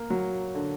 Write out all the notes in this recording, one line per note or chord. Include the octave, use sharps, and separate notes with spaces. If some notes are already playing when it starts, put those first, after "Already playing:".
Already playing: A#3
F#3
D3